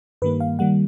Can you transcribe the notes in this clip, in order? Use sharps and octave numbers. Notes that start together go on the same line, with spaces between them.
G2 D#3 G3 A#3 B4
F5
D#3 G3 A#3 F#5